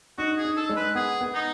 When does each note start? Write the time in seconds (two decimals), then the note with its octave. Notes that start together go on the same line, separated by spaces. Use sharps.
0.18 D#4 F#4
0.38 G#4
0.45 D#4
0.57 A4
0.69 G#3
0.76 B4
0.95 B3 G#4
1.21 B3
1.34 D#4